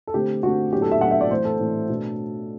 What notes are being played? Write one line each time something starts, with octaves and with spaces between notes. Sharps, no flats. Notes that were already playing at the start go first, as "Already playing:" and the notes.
A4
D3 A3 C4 G4
D3 A3 C4 F#4
A2 F#3 B3 D4 G4
A4
E5
A2 F#3 B3 D4 F#5
E5
D5
A2 E3 A3 C4 C5
A4
A2 E3 A3 C4
B2 A3 D4